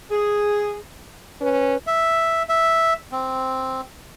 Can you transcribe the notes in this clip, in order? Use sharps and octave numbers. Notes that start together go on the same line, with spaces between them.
G#4
C#4 B4
E5
E5
C4